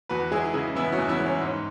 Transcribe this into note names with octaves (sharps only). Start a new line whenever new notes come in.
E2 F#4 B4
G#3 E4 G#4
C#3 E4 G#4
E3 B3 E4
C#4 F#4
E2
B3 E4
G#3
C#4
G#2 C#4